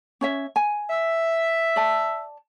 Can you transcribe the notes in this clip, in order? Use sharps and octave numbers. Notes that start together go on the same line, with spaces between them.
C#4 C#5 E5
G#5
E5
D5 A5